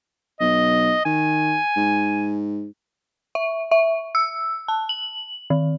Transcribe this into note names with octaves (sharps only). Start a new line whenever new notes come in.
B1 D#5
D#3 G#5
G#2
E5
E5
E6
A5
F#7
D#3